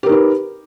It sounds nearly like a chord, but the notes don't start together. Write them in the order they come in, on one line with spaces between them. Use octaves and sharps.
G4 A#4 D#4 B4